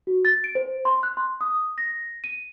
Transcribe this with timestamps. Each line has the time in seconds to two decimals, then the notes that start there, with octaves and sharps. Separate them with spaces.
0.07 F#4
0.25 A6
0.44 D7
0.55 C5
0.85 C6
1.03 F#6
1.17 C6
1.41 D#6
1.78 A#6
2.24 D#7